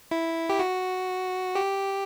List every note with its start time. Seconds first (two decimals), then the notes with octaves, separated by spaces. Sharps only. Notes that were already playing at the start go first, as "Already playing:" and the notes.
0.11 E4
0.49 G4
0.59 F#4
1.55 G4